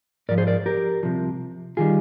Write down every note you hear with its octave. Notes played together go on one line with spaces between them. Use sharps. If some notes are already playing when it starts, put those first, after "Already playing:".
G#2 F3 A#4 D5
G#4 C5
A#4 D5
G4 A#4
C2 C3 F3
D#3 G3 F4 G#4